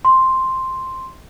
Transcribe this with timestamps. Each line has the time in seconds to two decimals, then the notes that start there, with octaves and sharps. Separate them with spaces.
0.05 C6